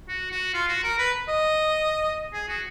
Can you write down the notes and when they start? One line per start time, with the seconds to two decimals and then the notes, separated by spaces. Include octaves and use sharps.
0.08 F#4
0.31 F#4
0.54 F4
0.68 F#4
0.84 A#4
0.98 B4
1.28 D#5
2.33 G#4
2.48 F#4